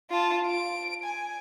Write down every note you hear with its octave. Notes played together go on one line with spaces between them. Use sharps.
F4 A5
D7
G#5